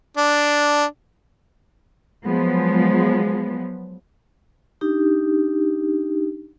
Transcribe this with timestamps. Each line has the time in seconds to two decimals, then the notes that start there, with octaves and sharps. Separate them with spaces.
0.17 D4
2.26 F3 F#3 G#3 B3
4.81 D4 D#4 G4